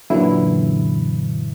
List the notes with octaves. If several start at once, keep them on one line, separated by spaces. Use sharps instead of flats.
F#2 A#2 D3 E3 F#3 E4